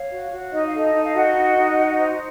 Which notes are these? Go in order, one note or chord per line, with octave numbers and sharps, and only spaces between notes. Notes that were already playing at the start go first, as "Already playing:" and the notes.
Already playing: C#5 F5
F#4
F#4
D#4 D#5
F5
A4 D#5
D#4
F5
F#4 D#5 F#5
D#4
D#4
F#4
C5